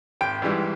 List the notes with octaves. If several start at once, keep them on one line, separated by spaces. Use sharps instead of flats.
G#1 G5
G#2 E3 G3